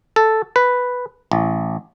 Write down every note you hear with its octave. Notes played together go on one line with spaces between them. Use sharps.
A4
B4
A1